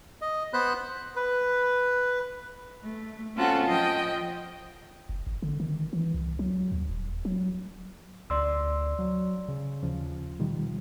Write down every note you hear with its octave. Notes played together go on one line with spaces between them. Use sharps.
D#5
B3 C5 B5 F#6
B4
A3
C4 C#4 F4 F#4 A4 F#5
F3 D#5 G5
F#1
G#1
D3
D#3
E3
C2
F#3
D#2
D#1
F#3
D2 D5 C6 E6
F#3
C#3
D#2 C#3 F3
B2 D#3 G3